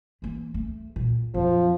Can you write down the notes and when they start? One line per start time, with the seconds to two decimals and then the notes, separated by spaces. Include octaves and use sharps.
0.22 E3 A#3
0.54 A3
0.96 A#2
1.34 F2 F3 F#3